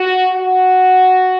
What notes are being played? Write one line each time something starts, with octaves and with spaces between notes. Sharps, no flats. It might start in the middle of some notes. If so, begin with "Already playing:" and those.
Already playing: F#4
F#4